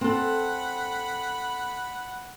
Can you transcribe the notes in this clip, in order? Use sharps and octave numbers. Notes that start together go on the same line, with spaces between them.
C4 A4 F#5 B5